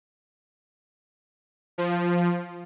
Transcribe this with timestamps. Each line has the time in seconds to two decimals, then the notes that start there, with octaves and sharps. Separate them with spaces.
1.78 F3